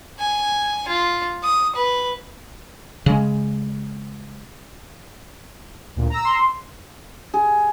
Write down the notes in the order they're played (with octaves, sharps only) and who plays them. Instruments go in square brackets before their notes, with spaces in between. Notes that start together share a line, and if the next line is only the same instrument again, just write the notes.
[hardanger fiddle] G#5
F4
D#6
B4
[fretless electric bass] C#3 G#3
[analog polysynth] D2 A#2
A#5 E6
[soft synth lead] C6
[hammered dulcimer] G#4